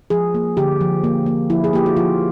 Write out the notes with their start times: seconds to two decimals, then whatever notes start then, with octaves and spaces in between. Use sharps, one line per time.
0.10 F3 G#4
0.35 A#3
0.57 D3 G4
0.81 F3
1.04 A#3
1.26 A#3
1.50 F3 E4
1.64 G#4
1.73 A#3 G4
1.86 F#4
1.97 F3 F4